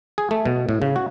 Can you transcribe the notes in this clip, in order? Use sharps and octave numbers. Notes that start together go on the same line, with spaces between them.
G#4
A3
B2
A2
C#3
F#4